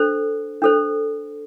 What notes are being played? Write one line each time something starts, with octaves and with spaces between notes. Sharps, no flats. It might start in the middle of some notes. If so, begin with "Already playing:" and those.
Already playing: D4 A4 C5
D4 A4 C5